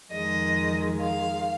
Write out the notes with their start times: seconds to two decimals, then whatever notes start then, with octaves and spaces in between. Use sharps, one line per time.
0.11 F2 D#3 G#3 D#5
0.99 F5